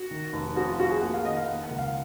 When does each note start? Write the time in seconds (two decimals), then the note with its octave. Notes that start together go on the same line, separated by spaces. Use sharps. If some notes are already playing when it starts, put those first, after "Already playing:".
Already playing: F#4
0.11 D#3
0.33 F1
0.56 F2 F#4
0.68 F4
0.79 C3 F#4
0.90 G#4
1.02 A#3 F#5
1.14 F5
1.25 D#3 D#5
1.36 F5
1.48 A#3 F#5
1.64 F#5
1.71 C#2
1.78 F5